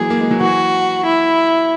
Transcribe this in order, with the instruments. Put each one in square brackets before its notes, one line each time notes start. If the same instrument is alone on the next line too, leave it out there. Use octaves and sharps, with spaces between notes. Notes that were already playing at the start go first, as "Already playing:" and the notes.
Already playing: [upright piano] E3 F#3 G#3 A#3 [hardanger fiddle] G#4
[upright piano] A#3
G#3
F#3
[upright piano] E3 [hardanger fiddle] F#4
[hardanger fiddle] E4